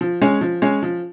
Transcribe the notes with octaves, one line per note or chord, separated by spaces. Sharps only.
F3
G#3 C#4
F3
G#3 C#4
F3